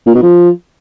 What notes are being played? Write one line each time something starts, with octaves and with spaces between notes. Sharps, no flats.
A#2
B2
F3